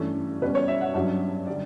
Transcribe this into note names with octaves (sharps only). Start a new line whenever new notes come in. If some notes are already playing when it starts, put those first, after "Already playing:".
Already playing: G2 E3 A3 C#4
B2 G3 C#4 B4
C#5
E5
F#5
G2 F#3 C#4 E5
D3 G3 D5